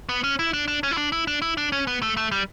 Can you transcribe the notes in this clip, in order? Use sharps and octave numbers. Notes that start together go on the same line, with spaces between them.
B3
C#4
E4
D4
D4
C#4
E4
D4
E4
D4
E4
D4
C#4
B3
A3
A3
G3